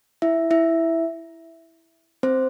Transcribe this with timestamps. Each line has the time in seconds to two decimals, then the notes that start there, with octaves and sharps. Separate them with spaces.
0.22 E4 E5
0.51 E4 E5
2.23 C4 C5